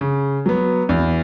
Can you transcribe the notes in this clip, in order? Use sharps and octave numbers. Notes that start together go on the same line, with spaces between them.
C#3
F#3 B3
E2